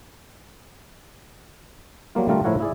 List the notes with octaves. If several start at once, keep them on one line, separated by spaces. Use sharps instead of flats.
F#3 G3 A#3 F4
D3 G3 A3 F4 A#4
A2 F3 E4 A#4 C#5 F#5
E4 G#4 D5